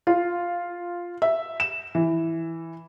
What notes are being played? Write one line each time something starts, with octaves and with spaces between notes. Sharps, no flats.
F4
E5
E7
E3